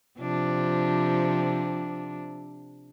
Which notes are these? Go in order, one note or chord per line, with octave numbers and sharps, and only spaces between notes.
C3 F3 D4